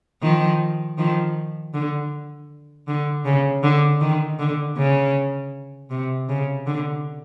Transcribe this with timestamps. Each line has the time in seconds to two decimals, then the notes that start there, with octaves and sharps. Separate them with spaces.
0.22 D#3 F3
0.98 D#3 F3
1.74 D3
2.88 D3
3.25 C#3
3.63 D3
4.01 D#3
4.39 D3
4.77 C#3
5.90 C3
6.29 C#3
6.67 D3